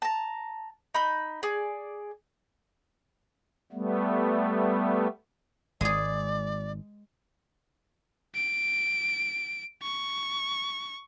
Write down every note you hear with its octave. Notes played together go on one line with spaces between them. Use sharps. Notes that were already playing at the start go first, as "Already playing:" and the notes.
A5 A#5
D#4 B5 G6
G#4 D5
G3 A3 B3
G#1 G#3 G#4 D5
D7
C#6